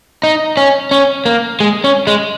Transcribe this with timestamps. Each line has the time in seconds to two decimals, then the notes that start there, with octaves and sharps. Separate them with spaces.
0.23 D#4
0.57 C#4
0.91 C#4
1.26 A#3
1.60 G#3
1.84 C#4
2.07 G#3